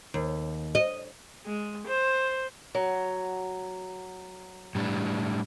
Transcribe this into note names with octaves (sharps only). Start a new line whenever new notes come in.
D#2
D#5
G#3
C5
F#3
A2 G3 D4